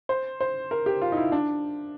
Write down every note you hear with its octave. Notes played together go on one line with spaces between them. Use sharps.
C5
C5
A#4
G4
F4
D#4
E4
D4